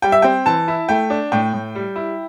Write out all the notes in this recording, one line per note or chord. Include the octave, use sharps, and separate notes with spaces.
G3 G5
E5
C4 G5
E3 A5
E4
A3 G5
D4
A2 G5
A2
G3
E4